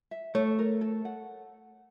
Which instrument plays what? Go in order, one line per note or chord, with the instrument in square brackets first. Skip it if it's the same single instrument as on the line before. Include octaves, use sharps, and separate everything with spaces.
[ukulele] E5
[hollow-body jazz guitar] A3 [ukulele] C#5
[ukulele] A#4
A4
F#5